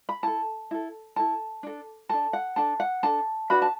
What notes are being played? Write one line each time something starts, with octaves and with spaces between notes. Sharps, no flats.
B5
E4 A4 A5
E4 A4
E4 A4 A5
D4 A4
D4 A4 A5
F#5
D4 A4 A5
F#5
D4 A4 A5
D4 F#4 B4 B5
A5